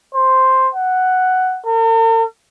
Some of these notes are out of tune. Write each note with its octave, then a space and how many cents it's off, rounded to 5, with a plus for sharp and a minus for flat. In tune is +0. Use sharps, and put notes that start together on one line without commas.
C5 +0
F#5 +5
A#4 -45